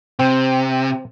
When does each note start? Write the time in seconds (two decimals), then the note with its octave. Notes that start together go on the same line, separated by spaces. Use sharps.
0.19 C3 C4